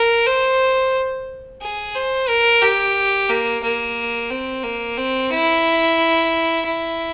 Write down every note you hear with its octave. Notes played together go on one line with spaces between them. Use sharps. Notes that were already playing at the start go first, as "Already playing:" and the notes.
Already playing: A#4
C5
G#4
C5
A#4
G4
A#3
A#3
C4
A#3
C4
E4
E4